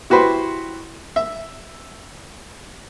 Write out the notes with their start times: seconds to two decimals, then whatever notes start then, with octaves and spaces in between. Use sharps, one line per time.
0.10 E4 F#4 G4 B4 C5
1.16 E5